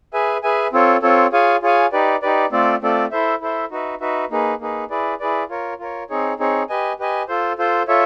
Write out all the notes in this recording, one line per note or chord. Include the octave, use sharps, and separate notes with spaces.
G#4 B4 E5 G#5
G#4 B4 E5 G#5
C4 F4 A4 C#5
C4 F4 A4 C#5
F4 G#4 C#5 F5 G#5
F4 G#4 C#5 F5 G#5
D#4 G4 B4 D5
D#4 G4 B4 D5
A3 C4 F4 A4 D5
A3 C4 F4 A4 D5
E4 A4 C5 E5
E4 A4 C5 E5
D#4 F#4 B4 E5
D#4 F#4 B4 E5
A#3 D#4 G#4 B4
A#3 D#4 G#4 B4
E4 G#4 B4 D5
E4 G#4 B4 D5
F4 A#4 C#5
F4 A#4 C#5
C4 D#4 G#4 C#5
C4 D#4 G#4 C#5
G4 B4 D#5 G#5
G4 B4 D#5 G#5
F4 A4 C5
F4 A4 C5
F4 A4 C#5 E5